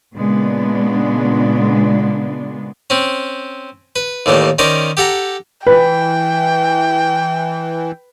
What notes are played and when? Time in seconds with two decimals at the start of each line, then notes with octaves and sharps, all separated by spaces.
0.15 A#2 C#3 G#3 B3 D4
2.90 C4 C#4
3.96 B4
4.26 D#2 A2 E3 G3
4.59 D#3 C#4 A#4 C5 D5
4.97 G4 A4 F#5 A#5
5.67 E3 B4 G5